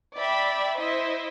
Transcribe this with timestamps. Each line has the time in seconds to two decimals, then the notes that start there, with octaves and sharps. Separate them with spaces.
0.17 D5 E5 G5 B5
0.78 E4 C5 D#5 E5